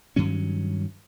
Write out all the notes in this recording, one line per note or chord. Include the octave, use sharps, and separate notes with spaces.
G2 D#3 F#3 C#4